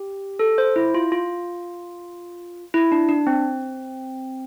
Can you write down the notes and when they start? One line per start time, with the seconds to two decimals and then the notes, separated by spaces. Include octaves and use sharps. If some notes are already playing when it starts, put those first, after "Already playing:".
Already playing: G4
0.39 A4
0.58 C5
0.76 E4
0.94 F4
1.12 F4
2.74 E4
2.92 D4
3.09 D4
3.27 C4